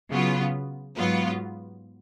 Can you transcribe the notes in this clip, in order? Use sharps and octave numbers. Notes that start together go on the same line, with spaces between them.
C#3 F#3 B3 F4
G#2 F#3 B3 F4